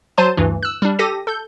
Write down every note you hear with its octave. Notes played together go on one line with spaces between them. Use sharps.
F#3 C5 A5 C6 D#7
D2 G2 E3
E6 F#6
G3 D4
G4 A4 A#6 D#7
A4 G6